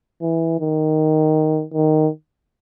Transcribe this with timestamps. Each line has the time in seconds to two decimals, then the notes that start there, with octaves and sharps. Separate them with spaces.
0.22 E3
0.60 D#3
1.74 D#3